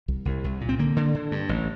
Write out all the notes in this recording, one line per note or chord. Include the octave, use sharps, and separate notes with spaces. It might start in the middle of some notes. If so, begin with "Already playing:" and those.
C2
C2
C2
A#2
C4
D3 A#3
D3
D3
G2
A1